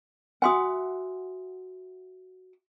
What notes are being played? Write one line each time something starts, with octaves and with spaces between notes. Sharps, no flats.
F#4 E5 F#5 G#5 C6 D#6